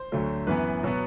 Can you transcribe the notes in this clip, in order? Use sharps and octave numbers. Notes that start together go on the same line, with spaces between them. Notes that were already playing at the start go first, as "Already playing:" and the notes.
Already playing: C5
D2 D3 F#3 A3
F#2 E3 B3 B4
B2 F#3 B3